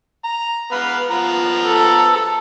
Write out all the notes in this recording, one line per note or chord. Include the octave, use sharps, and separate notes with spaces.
A#5
B3 B4 F5
F3 B3 A#5
A4